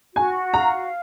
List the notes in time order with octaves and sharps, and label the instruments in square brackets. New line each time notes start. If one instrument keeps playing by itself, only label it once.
[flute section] F#4 [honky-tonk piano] G#5
[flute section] F5 [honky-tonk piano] A#5